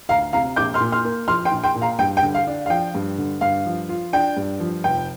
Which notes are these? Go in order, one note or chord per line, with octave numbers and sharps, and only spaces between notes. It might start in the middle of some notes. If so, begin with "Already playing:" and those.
D2 F5 A#5
C3 F5 A#5
A#1 D6 G6
C6 F6
A#2
C6 F6
A#3
F3 C6 F6
G5 C6
A#1
G5 C6
A#2
F5 A#5
G2 G5
G5
D3
F5
D4
F5
F3 G5
G2
D3
G2 F5
F3
F4
D4 G5
G2
F3
F1 G5